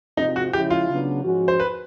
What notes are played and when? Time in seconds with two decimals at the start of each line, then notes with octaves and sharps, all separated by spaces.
0.17 C3 F3 G#3 C4 D#4 F4
0.36 F#4
0.53 C#3 F3 G#3 C#4 E4 G4
0.70 F4
0.89 C#3 F#3 B3 D4
1.24 G#2 F3 G#3 C#4 F#4
1.48 C5
1.60 B4